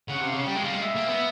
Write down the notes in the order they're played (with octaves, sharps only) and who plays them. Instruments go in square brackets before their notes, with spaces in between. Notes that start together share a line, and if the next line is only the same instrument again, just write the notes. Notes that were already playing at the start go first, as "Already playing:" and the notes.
[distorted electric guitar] C#3 [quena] F#5
[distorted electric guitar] C3
[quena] F5
[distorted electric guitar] C#3
[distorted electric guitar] G3 [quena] G5
[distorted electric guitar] G#3
[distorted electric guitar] G3 [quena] F5
[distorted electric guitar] G#3
[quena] E5
[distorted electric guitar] A#3
B3